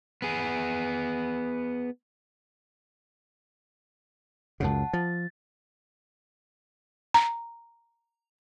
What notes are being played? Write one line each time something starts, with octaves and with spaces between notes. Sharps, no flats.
B3 G#4
C#2 F#2 C#3 F#5 A5
F3 A6
A#5